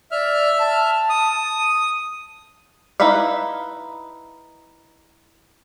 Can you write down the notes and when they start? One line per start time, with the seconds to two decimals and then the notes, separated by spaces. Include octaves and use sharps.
0.11 D5 E5 F6
0.58 A5
1.09 D#6
3.00 D#4 E4 B4 E5 F5